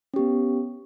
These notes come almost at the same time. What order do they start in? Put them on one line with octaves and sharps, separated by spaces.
C#4 G4 B3